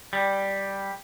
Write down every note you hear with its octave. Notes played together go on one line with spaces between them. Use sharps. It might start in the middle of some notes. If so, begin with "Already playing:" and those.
G3